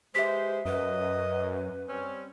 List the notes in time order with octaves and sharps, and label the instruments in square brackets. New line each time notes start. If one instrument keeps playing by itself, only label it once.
[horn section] G#3 B4 C5 [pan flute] G4 [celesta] E5 B6
[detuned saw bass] F#2 [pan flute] B4 [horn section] D#5
[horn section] G3 C4 C#4